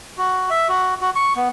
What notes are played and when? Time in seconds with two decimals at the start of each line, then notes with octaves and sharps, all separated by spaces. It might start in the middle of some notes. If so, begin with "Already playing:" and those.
0.18 F#4
0.50 E5
0.68 F#4
1.01 F#4
1.15 C#6
1.36 B3